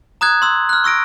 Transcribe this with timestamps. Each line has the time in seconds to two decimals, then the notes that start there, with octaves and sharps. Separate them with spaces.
0.21 A#5 D#6 F#6 G#6
0.42 C6 E6
0.69 F6 F#6
0.84 C#6 E6 A#6 D7